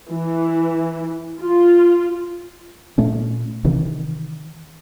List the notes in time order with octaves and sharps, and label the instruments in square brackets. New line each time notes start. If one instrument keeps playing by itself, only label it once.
[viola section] E3
F4
[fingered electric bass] A#2 A3 C#4
C3 D#3 E3